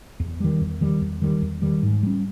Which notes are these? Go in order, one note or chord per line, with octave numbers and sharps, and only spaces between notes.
E2
D#3 G3
E2
D#3 G3
E2
D#3 G3
E2
D#3 G3
G#2
G3 C#4